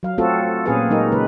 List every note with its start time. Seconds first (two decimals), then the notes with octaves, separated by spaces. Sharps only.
0.03 F#3 F5
0.18 A3 C4 F4 F#4 A4
0.66 A#2 C4 C#4 G#4 B4 F5
0.90 F#3 G#3 D#4 G4 A#4
1.12 C#3 G#3 B4